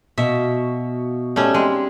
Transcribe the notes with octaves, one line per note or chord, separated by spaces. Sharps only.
B2 F#4 E5 F5
G3 A3 C#4 D#4 D#6
G#3 C4 D#4